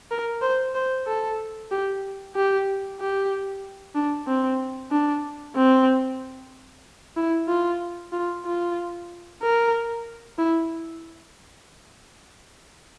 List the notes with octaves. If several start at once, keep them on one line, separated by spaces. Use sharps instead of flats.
A#4
C5
C5
A4
G4
G4
G4
D4
C4
D4
C4
E4
F4
F4
F4
A#4
E4